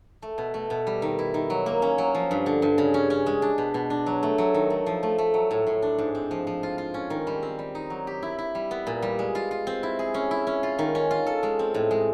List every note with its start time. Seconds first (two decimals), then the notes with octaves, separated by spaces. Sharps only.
0.22 A3
0.38 B2
0.54 A3
0.70 B2
0.87 G3
1.02 D#3
1.19 E4
1.34 D#3
1.50 F#3
1.66 A#3
1.82 C#4
1.98 F#3
2.15 F3
2.31 G2
2.46 D3
2.62 G2
2.78 C#3
2.94 C#4
3.10 C#4
3.26 G#3
3.42 D4
3.58 B2
3.74 B2
3.90 D4
4.06 F#3
4.23 A3
4.38 F#3
4.54 D#3
4.70 A3
4.86 F3
5.03 A3
5.18 A3
5.34 F#3
5.51 A2
5.67 A2
5.82 D4
5.98 G#2
6.15 C4
6.31 F3
6.47 F3
6.63 F4
6.78 F4
6.94 C#4
7.10 D#3
7.27 G3
7.43 C4
7.59 G3
7.75 D#4
7.90 F#3
8.07 G4
8.23 E4
8.39 E4
8.55 G3
8.71 B3
8.87 A#2
9.02 G3
9.19 G#3
9.35 F4
9.51 F4
9.67 C4
9.83 E4
9.99 G#4
10.14 C#4
10.31 E4
10.47 C#4
10.63 F4
10.79 D#3
10.95 C#4
11.11 F4
11.27 A4
11.43 G#3
11.59 C4
11.74 A2
11.91 G#3